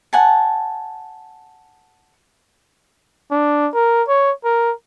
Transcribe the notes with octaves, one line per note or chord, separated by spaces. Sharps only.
F#5 G#5 A5
D4
A#4
C#5
A#4